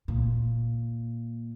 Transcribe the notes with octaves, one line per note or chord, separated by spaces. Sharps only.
A#2